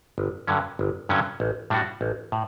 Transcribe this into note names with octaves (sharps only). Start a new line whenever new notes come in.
G1
G2 D3 F#3 C#4
G1
G2 D3 F#3 C#4
A1
A2 G3 D4 F#4
A1
A2